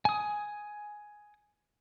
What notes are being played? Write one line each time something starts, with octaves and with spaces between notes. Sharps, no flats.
G#5 D#6